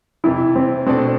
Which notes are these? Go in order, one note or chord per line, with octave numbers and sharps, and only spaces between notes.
F2 C3 E3 E4
C4
B2 A3 C4 D4 A4 D5